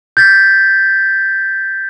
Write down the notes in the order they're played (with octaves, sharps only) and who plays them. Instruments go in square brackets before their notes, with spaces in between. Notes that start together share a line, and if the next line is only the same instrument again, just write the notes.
[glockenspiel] G6 A6 B6